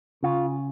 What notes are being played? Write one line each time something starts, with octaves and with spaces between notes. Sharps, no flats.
C#3 F4